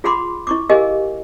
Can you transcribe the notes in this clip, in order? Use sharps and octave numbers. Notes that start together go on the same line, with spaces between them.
F4 G#4 F#5 B5 C6 D6
E4 C#6 D6
G4 G#4 A#4 D#5 F5 G#5